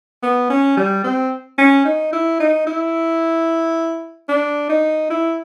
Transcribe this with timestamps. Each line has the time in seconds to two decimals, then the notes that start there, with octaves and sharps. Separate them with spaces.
0.23 B3
0.50 C#4
0.77 G3
1.04 C4
1.58 C#4
1.85 D#4
2.13 E4
2.40 D#4
2.67 E4
4.28 D4
4.69 D#4
5.10 E4